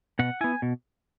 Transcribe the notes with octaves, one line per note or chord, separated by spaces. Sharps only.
B2 F#5
B3 E4 G#5
B2